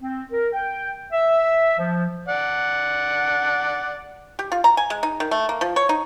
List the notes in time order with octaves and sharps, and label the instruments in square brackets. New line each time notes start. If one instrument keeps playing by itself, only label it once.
[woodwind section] C4
A#4
G5
E5
F3
[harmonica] D5 F#5
[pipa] G4
F4
A#5
G#5
G#3
D#4
D#3
A3
A#3
F3
C#5
D#4